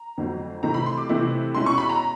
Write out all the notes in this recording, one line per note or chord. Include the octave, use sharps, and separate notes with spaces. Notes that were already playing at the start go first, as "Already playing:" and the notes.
Already playing: A#5
F2 D3 F#3 A3 C4
C3 E3 A3 C4 E4 A#5
B5
C6
D6
C3 E3 A3 C4 E4
B2 G#3 C#4 E4 C6
C#6
B5
A#5